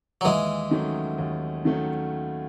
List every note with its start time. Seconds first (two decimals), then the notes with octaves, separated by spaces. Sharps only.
0.21 F#3
0.25 D#2 E3 G#3
0.71 D#3 F#3 A3 C#4
1.18 D#2
1.65 D#3 F#3 A3 C#4